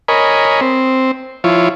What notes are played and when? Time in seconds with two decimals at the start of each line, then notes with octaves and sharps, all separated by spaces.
0.08 A#4 C#5 D#5 G#5 B5
0.61 C4
1.44 F3 E4 F4 C#5